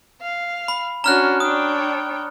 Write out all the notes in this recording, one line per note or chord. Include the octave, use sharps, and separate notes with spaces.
F5
B5
C#4 D4 F#4 A#5 F6 F#6
D4 C#5 G5 D#6